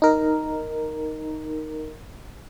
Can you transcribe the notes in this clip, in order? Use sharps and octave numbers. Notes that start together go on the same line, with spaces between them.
D#4 A#4